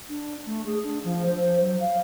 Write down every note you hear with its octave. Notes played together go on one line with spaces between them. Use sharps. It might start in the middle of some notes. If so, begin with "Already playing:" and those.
D4
A3
G#4
D4
F3
C5
F#3
F5